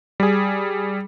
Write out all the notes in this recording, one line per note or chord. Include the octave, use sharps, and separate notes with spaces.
G3 G#4